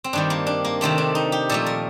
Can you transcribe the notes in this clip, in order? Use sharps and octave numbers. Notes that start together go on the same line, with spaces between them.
C4
G2 D#3 G3 D4
A#3
D4
A#3
C3 D#3 A3 C4
D4
D#4
G4
A#2 F3 A3 A4
A#4